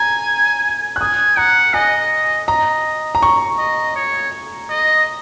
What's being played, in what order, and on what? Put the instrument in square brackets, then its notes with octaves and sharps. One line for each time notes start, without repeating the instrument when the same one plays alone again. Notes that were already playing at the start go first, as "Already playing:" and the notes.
Already playing: [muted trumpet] G#5 [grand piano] A#5
[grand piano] F#6
[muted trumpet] G#5 [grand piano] D#6
[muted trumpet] F#5 [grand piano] A#5
[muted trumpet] D#5 [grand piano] G#5
[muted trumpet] D#5 [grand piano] A#5
[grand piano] A#5
C#6
[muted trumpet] D#5
C#5
D#5